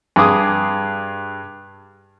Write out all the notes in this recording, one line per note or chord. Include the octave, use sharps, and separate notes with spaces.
G2 G#4 D6 D#6